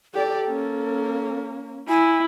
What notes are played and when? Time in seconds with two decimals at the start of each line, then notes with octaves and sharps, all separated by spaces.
0.14 G4 A4 D5
0.46 A#3 C#4
1.89 E4 G#5